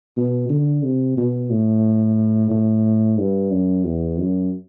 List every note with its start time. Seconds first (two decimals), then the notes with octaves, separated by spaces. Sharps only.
0.17 B2
0.49 D3
0.83 C3
1.17 B2
1.50 A2
2.51 A2
3.18 G2
3.51 F#2
3.85 E2
4.18 F#2